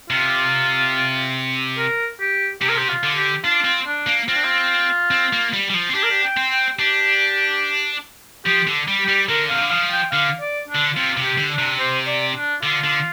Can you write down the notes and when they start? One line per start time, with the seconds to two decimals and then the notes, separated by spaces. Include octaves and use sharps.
0.10 C3 F4
1.77 A#4
2.20 G4
2.61 C3 G4
2.69 A#4
2.77 G4
2.89 F4
3.03 D3
3.16 G4
3.44 D4 F4
3.65 C4
3.87 D4
4.07 A#3
4.28 C4 F4
4.36 D4
4.44 F4
5.11 C4
5.33 A#3
5.53 G3
5.70 G3
5.74 F3
5.89 C4
5.94 D4 G4
6.03 A#4
6.10 G4
6.23 G5
6.37 C4
6.51 G5
6.78 D4 G4
8.45 F3 G4
8.67 D3
8.88 G3
9.02 G4
9.08 G3
9.29 D3 A#4
9.50 C3 F5
9.61 D3
9.70 F3 F5
9.92 G5
10.12 D3 F5
10.41 D5
10.68 D4
10.75 D3
10.95 C3 F4
11.17 C3
11.24 G4
11.38 D3
11.52 D4
11.59 C3
11.79 C5
12.07 D5
12.36 D4
12.62 D3 F4
12.84 D3